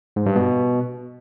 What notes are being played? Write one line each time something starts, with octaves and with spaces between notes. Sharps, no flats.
G#2
G2
B2